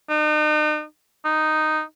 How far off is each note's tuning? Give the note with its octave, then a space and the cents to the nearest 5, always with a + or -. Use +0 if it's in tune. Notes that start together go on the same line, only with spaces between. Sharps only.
D#4 -40
D#4 -5